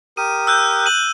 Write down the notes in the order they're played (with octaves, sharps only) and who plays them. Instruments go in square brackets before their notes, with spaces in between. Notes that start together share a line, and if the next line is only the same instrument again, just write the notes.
[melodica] G4 A#4 D#6 [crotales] D#7
[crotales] E6 F#6 G6
D#7 F#7